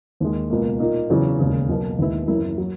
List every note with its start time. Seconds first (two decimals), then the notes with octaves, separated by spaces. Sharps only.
0.20 D#2 D#3 G#3
0.50 C#2 B2 A#3
0.80 A#2 A#3 D#4
1.10 E2 C#3 F#3
1.39 E1 D#2 C#3
1.69 B1 B2 A#3
1.98 D#2 D#3 G#3 B3 E4
2.27 F#1 F#2 E3 A#3 E4
2.58 F#3